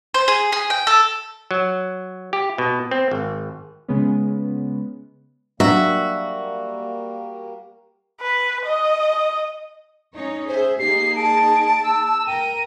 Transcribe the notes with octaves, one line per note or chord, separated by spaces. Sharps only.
C5
G#4
G#4
G5
A4
F#3
G4
B2
C4
G#1
C#3 G#3 B3 C#4
F#3 G3 A#3 D4 F#4 E5
B4
D#5
C#4 D#4 C#5
G#4 C5 E5
A#3 D#4 G4 G#4 C7
A5 D7
E6
A#4 G5 D#7